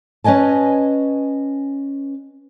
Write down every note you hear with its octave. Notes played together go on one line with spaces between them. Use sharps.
C#4 B4 D#5 G#5 A5